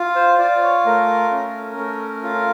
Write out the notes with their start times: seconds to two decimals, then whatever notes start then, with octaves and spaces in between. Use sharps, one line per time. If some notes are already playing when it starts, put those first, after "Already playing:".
Already playing: F4
0.16 C5
0.39 F4 D5
0.63 C#5
0.85 A3 A#4
1.31 C#4
1.77 A3
2.23 F4